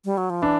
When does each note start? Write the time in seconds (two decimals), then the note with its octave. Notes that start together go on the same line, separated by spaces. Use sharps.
0.05 G3
0.17 F#3
0.30 F3
0.42 E3 D4